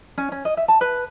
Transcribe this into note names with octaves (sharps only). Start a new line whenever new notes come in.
C#4
C#4
D#5
E5
A5
B4